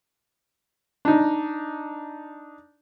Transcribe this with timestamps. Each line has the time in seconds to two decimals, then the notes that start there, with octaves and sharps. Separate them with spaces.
1.05 D4 D#4